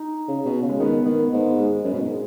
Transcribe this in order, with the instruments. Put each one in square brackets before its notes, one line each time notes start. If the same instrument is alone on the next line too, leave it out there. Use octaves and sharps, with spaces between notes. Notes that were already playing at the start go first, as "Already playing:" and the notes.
Already playing: [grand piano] D#4
[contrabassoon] C#3
B2
C#3
[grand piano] G#3
[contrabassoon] D#3 [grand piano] B3
[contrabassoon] D#3 [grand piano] B3
[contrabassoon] G#2 [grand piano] B3
[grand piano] G#3
[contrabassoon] F#2
B2
G#2